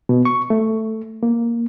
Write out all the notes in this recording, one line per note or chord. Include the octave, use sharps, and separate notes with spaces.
B2
C#6
A3
A#3